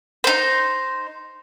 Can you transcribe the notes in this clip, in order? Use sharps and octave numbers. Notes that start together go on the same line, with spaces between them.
D#4 C5